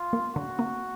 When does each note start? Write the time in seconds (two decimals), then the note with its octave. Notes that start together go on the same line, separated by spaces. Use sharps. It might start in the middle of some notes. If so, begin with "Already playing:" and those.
Already playing: F4
0.13 A#3
0.35 D3 F#4
0.59 A#3